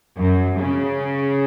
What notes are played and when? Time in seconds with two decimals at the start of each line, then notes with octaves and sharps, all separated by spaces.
0.18 F#2
0.59 C#3